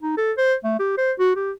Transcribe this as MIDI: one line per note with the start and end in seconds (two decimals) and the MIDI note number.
0.02 0.16 63
0.17 0.32 69
0.37 0.54 72
0.64 0.78 57
0.79 0.96 67
0.98 1.12 72
1.19 1.34 66
1.36 1.51 67